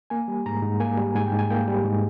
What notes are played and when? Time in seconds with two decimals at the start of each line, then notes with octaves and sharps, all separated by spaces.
0.10 A#3 G#5
0.28 G3
0.46 G#2 A#5
0.63 G#2
0.80 A#3 G#5
0.97 G3
1.15 G#2 G#5
1.26 G5
1.33 G#2
1.39 G#5
1.50 A#3 G5
1.68 G3
1.84 G#2